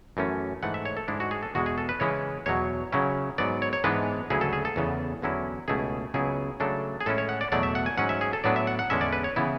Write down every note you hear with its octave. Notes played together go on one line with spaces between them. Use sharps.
F#2 E3 A3 C#4
G#2 E3 A3 F#5
E5
C#5
A4
G#2 G#3 D4 E4
F#4
G#4
A4
E2 B2 G#3 F#4
G#4
A4
B4
C#3 E3 G#3 C#4 E4 C#5
E2 B2 F#3 C#5
C#3 F#3 C#4 E4
G#2 F#3 B3 D5
C#5
C#5
G#2 E3 G#3 B3 D4 B4
D2 C#3 F#3 C#4 E4 G#4
A4
G#4
A4
E2 C#3 E3 B3
E2 D3 F#3 C#4 E4
C#2 B2 A3 E4 G#4
C#2 C#3 F#3 B3 E4 G#4
C#3 F#3 A3 D4 A4
G#4
A2 G#3 C#4 E4 A4
C#5
F#5
D5
E2 B2 F#3 A3 D5
E5
F#5
G#5
G#2 F#3 C#4 F#5
E5
G#4
A4
A2 F#3 B3 D4 D5
E5
F#5
F#5
E2 D3 G#3 C#4 E4 E5
D5
B4
C#5
C#3 E3 B3 E4